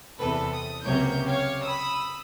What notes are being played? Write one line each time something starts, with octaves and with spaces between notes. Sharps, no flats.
E2 C3 A4 B4
D#6
C#2 C3 F#3 A#3 C#5 G6
G4 C#5 F5
B5 D#6 E6